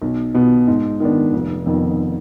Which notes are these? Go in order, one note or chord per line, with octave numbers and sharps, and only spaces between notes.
B1
B2 B3
G#2
D#3 B3 D4
F1
F2 D#3 B3